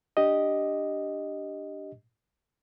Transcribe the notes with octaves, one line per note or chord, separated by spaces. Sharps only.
D4 G4 D#5